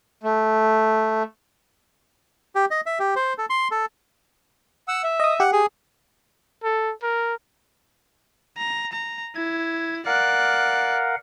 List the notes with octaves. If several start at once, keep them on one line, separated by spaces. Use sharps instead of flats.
A3
G4
D#5
E5
G4
C5
A4
C6
A4
F#5 E6
E5
D#5 D#6
G4 F#5
G#4
A4
A#4
A#5
A#5
E4 G#6
A#4 D5 F5 F#5 F#6